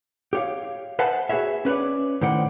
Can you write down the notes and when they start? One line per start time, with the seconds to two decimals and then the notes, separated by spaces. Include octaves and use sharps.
0.33 G4 C#5 F5
0.99 B4 C5 E5 F#5 G#5 A5
1.29 F#4 G#4 B4 C#5 E5
1.65 C#4 B4 C#5 D5
2.21 A2 D#3 C5 D5 F#5